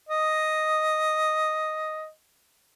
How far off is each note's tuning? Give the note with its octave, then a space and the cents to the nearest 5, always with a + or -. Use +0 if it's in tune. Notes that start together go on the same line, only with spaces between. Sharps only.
D#5 +0